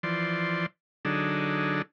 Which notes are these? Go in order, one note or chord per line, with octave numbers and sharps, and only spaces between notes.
E3 F3 D5 C6
D3 F#3 D4 D#4 G#4 A4